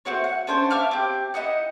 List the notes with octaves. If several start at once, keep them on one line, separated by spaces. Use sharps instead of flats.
A3 C4 F#4 C#5
F#5
C#4 D4 C5 C#5
E5 F5 D6 F6
C4 G4
D#4 E4 D#5 F#5